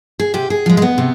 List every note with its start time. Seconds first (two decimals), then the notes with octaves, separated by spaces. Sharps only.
0.20 G#4
0.34 C3 G4
0.50 G#4
0.66 F3 G#3
0.77 G#3
0.82 B3
0.98 C3